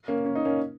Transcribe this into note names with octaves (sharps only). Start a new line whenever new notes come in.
A#3 C#4
C#4
D#4
A#3 C#4